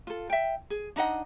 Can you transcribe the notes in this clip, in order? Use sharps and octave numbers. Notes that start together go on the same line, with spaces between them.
F4 A4
E5 G5
G#4
D4 D#4 D#5 F#5